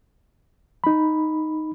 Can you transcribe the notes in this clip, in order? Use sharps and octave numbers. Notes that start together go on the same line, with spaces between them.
D#4 B5